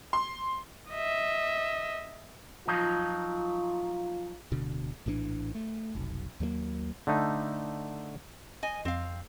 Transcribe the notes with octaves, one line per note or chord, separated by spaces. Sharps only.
C6
D#5 E5
F3 F#3 D#4 F4
D1 B2 D3
A#1 A2 E3 D4
A3
F1 B1
D#2 F#3 G#3 A#3
D3 A3 D#4
D#5 G#5
F2 C4 F5